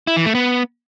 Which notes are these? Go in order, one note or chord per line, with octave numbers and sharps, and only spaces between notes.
E4
E3
A3
B3